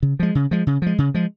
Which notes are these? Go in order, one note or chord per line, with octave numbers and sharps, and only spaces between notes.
C#3
F3 G#3
C#3
F3 G#3
C#3
F3 G#3
C#3
F3 G#3